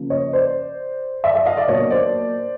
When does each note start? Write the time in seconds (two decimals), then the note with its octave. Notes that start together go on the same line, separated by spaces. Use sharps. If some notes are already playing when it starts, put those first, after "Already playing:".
Already playing: C#3 F3 A#3
0.10 C#5 D#5
0.33 C5 D5
1.24 D5 E5
1.34 D5 E5
1.46 D#5 F5
1.57 D5 E5
1.68 A#2 F#3 B3 D4 C#5 D#5
1.90 C5 D5